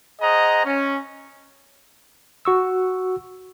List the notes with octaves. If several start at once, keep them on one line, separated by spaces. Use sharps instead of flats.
G#4 C5 D#5 F#5 A#5
C#4
F#4 C#6 E6